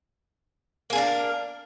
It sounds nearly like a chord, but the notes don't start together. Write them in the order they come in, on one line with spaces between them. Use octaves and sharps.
A#3 G#4 D4 A#4